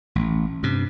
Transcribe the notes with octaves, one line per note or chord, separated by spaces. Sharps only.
A1
G2 C3